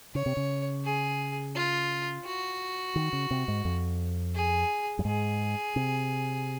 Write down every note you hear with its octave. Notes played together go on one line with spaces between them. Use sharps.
C#3 C#5
C3
C#3
G#4
F4
F#4
D#3
C#3
C3
G#2
F2
G#4
F#2
G#2 G#4
C3